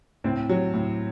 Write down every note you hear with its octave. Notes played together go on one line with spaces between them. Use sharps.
A2 C4
F#3
A2